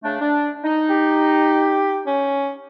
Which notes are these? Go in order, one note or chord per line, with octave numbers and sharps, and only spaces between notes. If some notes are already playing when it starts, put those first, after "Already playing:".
C#3 A3 D4
D4
D#4
G4
C#4